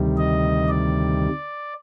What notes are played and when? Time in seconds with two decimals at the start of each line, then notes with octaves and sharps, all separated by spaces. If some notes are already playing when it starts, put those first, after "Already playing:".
Already playing: D2 C3 D#3 G3
0.18 D#5
0.68 D5